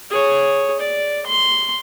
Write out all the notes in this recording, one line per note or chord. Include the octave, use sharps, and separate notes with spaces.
G#4 C#5
D5
C6